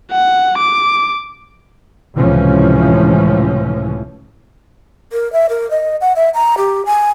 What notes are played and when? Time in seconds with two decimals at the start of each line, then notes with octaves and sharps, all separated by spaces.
0.12 F#5
0.58 D6
2.15 C#2 A2 C3 E3 F3 C#4
5.13 A#4
5.33 E5
5.49 A#4
5.71 D#5
6.01 F#5
6.16 E5
6.34 A#5
6.58 G4
6.86 G#5